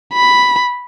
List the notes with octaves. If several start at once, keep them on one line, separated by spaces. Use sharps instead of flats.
B5